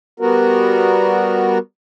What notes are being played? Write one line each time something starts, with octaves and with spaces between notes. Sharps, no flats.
G3 B3 F#4 A#4